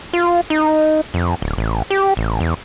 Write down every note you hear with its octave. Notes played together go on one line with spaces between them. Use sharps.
F4
D#4
F2
D1
A1
G4
A1
E2